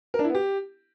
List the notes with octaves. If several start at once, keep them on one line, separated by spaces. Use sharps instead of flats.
A#4
D4
E4
B3
G4